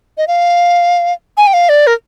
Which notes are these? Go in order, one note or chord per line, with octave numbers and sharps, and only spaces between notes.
D#5
F5
G#5
G5
F5
D5
A#4